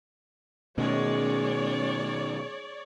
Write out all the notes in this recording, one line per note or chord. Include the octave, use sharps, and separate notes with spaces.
B2 D#3 G#3 A3 C#4 C#5 D5